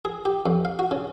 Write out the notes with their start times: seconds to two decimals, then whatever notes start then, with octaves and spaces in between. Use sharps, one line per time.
0.05 G#4
0.25 G4
0.46 F2
0.65 F5
0.79 F#4
0.91 C#3